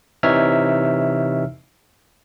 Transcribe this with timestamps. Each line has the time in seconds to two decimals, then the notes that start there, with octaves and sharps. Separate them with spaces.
0.23 C3 E3 D#4 C#5 E5 F6